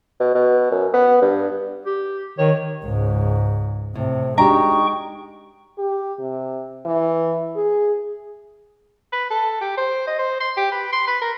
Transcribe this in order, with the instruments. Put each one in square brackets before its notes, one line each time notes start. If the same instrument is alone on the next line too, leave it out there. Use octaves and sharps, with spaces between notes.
[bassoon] B2
B2
F#2
B3
G2
[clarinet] G4
[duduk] D#3 [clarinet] C#5
[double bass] C#2 G#2
[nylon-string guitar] A2 [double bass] C3
[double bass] G#3 D#4 [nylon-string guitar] D4 F#4 G4 [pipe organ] G5 C#6 [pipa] A#5
[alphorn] G4
C3
E3
G#4
[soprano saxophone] B4
A4
G4
C5
D#5
C5
C6
G4
B4
C6
B4
A#4